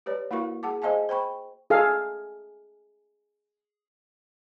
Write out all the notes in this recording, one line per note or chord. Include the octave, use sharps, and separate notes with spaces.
G4 B4 C#5 D5
A#3 E4 F#4 A#4 F5 C#6
G#4 F#5 A5 D6
G#4 C5 D#5 F5 G#5 A5
C5 G5 B5 C#6
G#4 A4 F5